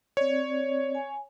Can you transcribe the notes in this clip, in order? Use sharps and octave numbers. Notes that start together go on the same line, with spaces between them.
C4 C#5 D5
G#5